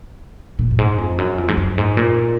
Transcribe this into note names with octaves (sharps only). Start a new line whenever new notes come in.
A#2
F#2
G#2
F2
F#2
F2
G#2
F#2
G#2
A#2